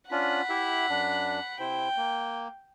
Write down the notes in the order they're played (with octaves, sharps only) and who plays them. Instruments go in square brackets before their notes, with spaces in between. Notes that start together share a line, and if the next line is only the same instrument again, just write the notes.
[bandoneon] C#4 D4 F4 [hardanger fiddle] F#5 B5
[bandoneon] E4 G4 E5
F#2 D4
[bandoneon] C3 E4 C5 [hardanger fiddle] G5
[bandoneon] A#3